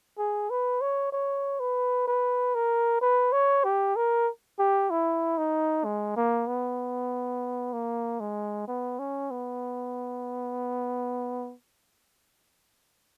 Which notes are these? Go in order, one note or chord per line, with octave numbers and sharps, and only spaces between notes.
G#4
B4
C#5
C#5
B4
B4
A#4
B4
C#5
G4
A#4
G4
E4
D#4
G#3
A#3
B3
A#3
G#3
B3
C#4
B3